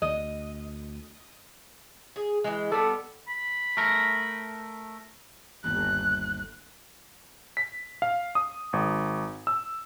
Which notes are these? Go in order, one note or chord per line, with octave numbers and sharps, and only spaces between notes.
D2 D#5
G#4
E3 G#3
G3 B3 A4
B5
A3 A#4
G1 D#2 F#6
B6
F5
D#6
G#1
E6